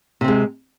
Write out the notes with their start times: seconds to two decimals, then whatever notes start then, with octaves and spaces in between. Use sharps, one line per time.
0.21 C3
0.24 C4
0.28 G#3